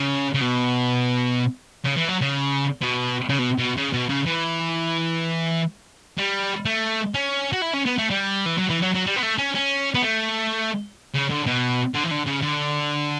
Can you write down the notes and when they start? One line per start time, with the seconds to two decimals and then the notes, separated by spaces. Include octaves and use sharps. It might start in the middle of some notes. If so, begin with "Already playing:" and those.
Already playing: C#3
0.34 C#3
0.41 B2
1.85 C#3
1.97 E3
2.09 F#3
2.21 C#3
2.81 B2
3.29 C#3
3.39 B2
3.58 B2
3.77 C#3
3.93 B2
4.09 C#3
4.26 E3
6.18 G3
6.65 A3
7.14 C#4
7.53 F#4
7.62 E4
7.74 C#4
7.86 B3
7.98 A3
8.10 G3
8.46 E3
8.58 F#3
8.70 E3
8.83 F#3
8.94 F#3
9.07 G3
9.16 B3
9.23 A3
9.38 C#4
9.55 C#4
9.95 B3
10.02 A3
11.14 C#3
11.30 D3
11.46 B2
11.94 D3
12.04 E3
12.11 D3
12.27 C#3
12.42 D3